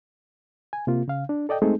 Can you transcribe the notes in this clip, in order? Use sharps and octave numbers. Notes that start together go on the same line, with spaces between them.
G#5
C3 A#3 F4
C#3 F5
D4
A4 D5 D#5 G5
G#3 A3 C4 D#4 G#4 A4